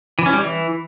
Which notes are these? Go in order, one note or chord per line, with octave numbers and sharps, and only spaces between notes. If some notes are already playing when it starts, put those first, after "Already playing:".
E3
C#4
G3
E3